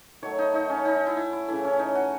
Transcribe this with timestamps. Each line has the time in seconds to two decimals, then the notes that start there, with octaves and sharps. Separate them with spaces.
0.23 D#3 F#3 A3 C#5
0.39 D#4
0.54 D#4
0.70 C#4
0.85 D#4
0.96 D#4
1.07 E4
1.17 E4
1.33 E4
1.48 C#3 E3 A3 E4
1.64 C#4
1.79 D#4
1.95 F#4